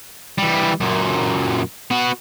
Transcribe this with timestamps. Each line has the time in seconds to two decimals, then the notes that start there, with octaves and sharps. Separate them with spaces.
0.38 E3 G3
0.80 F#2 A#2
1.90 B3 F#4